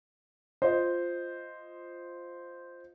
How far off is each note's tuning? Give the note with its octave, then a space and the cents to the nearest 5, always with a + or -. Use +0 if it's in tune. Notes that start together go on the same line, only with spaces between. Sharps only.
F4 +0 C5 -5 D#5 +0